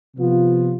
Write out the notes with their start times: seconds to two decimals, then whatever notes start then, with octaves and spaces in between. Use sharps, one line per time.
0.16 C3 F3 B3 F4